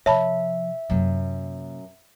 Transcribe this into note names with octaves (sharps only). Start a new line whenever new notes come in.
C3 F3 C#5 E5 A5 B5
F#2 C3 A#3